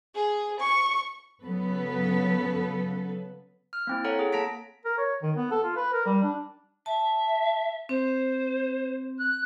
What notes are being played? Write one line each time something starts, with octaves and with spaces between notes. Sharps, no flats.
G#4
C#6
C#3 F#3 B3 A4 B4
F6
A#3 C4 E4
A4 C#5 F#5 A#5
G#4
A#3 A5 A#5 A#6 B6 D7
A#4
C#5
D#3
B3
A4
F4
B4
A#4
G3
D4
E5 A5
C4 C5
F#6